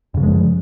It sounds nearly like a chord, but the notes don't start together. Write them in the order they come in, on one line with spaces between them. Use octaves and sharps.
F#2 C#3 F3 G#3